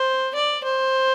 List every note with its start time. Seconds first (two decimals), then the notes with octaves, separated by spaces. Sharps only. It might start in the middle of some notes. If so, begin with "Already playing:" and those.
Already playing: C5
0.35 D5
0.64 C5